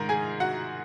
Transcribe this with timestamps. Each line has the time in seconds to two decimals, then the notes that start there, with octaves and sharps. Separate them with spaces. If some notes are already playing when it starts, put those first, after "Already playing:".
Already playing: G#2 D#3 A#4 A#5
0.09 G#4 G#5
0.40 F#4 F#5